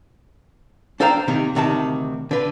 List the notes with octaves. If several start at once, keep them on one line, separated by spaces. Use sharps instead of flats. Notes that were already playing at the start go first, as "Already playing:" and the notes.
D4 A4 C5 F5 G5 A#5
C3 D#3 A#3
D2 C3 D#3 A5
D3 B4